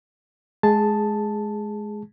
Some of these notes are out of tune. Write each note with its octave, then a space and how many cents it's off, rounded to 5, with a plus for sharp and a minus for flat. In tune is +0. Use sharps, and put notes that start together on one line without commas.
G#3 +20 G#4 +0 A5 +0